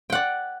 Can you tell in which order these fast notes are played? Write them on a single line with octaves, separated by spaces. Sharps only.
G5 F#5 D5